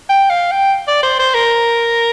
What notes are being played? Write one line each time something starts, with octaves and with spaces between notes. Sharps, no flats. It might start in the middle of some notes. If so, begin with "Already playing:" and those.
G5
F5
G5
D5
C5
C5
A#4